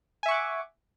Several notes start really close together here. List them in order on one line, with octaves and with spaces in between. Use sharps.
G#5 E5 C#6 F#5 D6